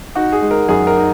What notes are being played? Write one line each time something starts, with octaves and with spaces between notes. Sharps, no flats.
D#4 F#4
G#4
G#3
A#4
F#2 G#4
A#4
D#4